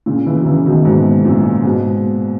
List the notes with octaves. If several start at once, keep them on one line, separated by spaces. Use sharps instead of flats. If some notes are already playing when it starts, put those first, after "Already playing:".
A#2 C#3
C#3 E3
F#3
C#3 E3
B2 D#3
G#2 B2
F#2 A#2
G#2 B2